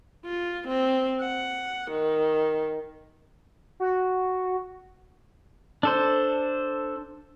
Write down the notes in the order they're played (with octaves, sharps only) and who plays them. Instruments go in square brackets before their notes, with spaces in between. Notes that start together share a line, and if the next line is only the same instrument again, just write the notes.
[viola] F4
C4
F#5
D#3
[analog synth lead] F#4
[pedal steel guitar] D4 A4 C5